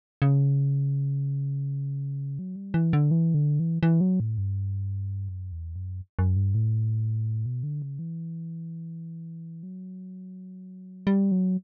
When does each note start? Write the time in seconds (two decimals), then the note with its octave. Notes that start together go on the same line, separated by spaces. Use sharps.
0.22 C#3
2.39 F#3
2.56 G3
2.74 E3
2.93 D3
3.11 E3
3.34 D3
3.60 E3
3.83 E3
4.01 F#3
4.20 A2
4.38 G2
5.29 F#2
5.52 E2
5.76 F#2
6.19 F#2
6.36 G2
6.55 A2
7.46 B2
7.63 D3
7.82 C#3
7.99 E3
9.63 F#3
11.07 G3
11.32 F#3